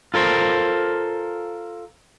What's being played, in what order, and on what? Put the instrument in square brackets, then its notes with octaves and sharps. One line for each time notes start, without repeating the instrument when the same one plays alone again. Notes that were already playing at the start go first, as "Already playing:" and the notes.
[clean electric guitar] F4 A4 A#4 C5